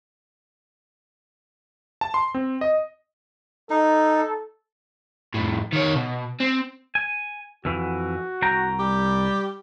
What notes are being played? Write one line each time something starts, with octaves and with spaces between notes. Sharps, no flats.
A5
C6
C4
D#5
D#4 A4
F2 A2
D#3 C#5
B2
C4
G#5
F2 E3 F#4
C2 G5 A#5
G3 G4